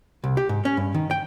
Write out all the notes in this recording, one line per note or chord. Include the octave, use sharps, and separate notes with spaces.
C2
G4
G#2
C#4
G2
D#3
G5